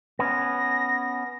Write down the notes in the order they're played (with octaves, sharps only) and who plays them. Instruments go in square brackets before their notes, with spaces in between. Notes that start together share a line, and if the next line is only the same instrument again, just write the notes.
[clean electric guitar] B3 C#4 [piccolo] A#6